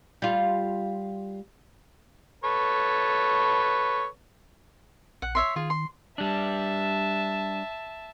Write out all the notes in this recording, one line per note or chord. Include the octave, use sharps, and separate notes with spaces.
G3 F4
A4 B4 C#5
A#1 F#5
C#5 E5 C6
D#3 F4 G#4
C6
G3 D4 E5 A5